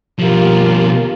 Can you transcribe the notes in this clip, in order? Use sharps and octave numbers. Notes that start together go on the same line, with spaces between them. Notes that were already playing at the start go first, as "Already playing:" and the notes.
B2 F3 A#3 F4 G4